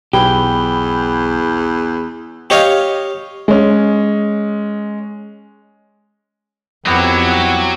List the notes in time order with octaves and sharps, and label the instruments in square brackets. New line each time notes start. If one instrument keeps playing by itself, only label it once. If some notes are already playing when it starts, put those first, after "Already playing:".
[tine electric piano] B1 [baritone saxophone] E2 [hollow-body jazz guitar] G4 [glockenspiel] B5 G7
[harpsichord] G4 C#5 D#5 F5
[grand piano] G#3 C#4
[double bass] F2 [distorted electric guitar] F#3 [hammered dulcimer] B3 G4 G5 [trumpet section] E4 F#5